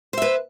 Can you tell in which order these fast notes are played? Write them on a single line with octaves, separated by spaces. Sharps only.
C5 E5 B4